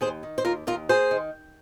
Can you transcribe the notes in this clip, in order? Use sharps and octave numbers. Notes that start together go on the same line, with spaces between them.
D#2 G#4 C5
D#3
C5
D#2 F4 A#4
D#2 F4 A#4
A#3 G#4 C5
D#3